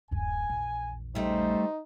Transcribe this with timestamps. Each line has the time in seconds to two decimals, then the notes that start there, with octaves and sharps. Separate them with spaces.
0.11 D1 F#2 G#5
0.50 A#1 E2
1.15 C#3 G3 A3 D#4 G4 C5